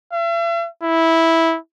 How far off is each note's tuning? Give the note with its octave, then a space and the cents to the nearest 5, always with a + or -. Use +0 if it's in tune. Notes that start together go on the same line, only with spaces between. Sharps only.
E5 +45
E4 -10